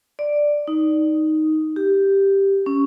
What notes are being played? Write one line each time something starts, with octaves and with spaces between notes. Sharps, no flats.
D5
D#4
G4
C#4